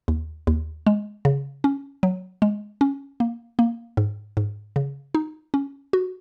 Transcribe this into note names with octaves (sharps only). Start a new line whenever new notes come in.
D#2
D#2
G#3
C#3
C#4
F#3
G#3
C#4
A#3
A#3
G#2
G#2
C#3
D#4
C#4
F#4